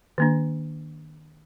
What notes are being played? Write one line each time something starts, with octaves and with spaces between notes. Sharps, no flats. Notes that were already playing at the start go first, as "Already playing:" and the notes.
D#3 A#3 D4